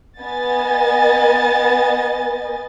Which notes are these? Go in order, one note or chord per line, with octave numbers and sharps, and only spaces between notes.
B3 D#5 G#5 A6